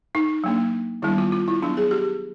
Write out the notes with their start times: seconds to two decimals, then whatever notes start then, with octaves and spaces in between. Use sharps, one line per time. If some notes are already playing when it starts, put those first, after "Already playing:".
0.15 D#4
0.44 F#3 A#3 D4
1.02 D#3 G3 B3 D4 E4
1.18 F4
1.32 F4
1.48 E4
1.62 F#3 B3 D4
1.77 G#4
1.91 G4